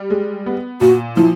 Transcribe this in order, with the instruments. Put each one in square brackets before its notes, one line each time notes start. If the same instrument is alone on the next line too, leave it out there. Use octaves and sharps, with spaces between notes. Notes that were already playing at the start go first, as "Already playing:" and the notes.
Already playing: [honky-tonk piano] G3
G#3
B3
[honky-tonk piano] A#2 [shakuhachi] F#4
[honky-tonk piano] F3 [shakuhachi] E4